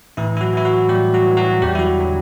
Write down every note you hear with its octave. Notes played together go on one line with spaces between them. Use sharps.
A2 E3 E4
E4
F#3 F#4
E3 E4
F#3 F#4
A2 G3 G4
F#3 F#4
E3
F#3 F#4
E2 G3 G4
E4
F#3 F#4
D3 F#3